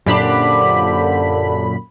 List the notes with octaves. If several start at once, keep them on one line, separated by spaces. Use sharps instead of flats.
F#2 A#2 D3 C4 D4 G4 B5